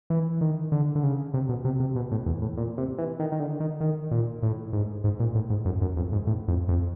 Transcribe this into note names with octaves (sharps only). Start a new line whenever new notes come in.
E3
D#3
D3
D3
C#3
C3
B2
C3
C3
B2
A2
E2
A2
A#2
C3
E3
D#3
D#3
D3
D#3
D#3
A#2
A2
G#2
G#2
A#2
A2
G#2
F#2
F#2
F2
G#2
A2
F2
F2